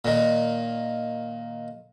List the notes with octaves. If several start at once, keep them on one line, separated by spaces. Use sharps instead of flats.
A#2 D#3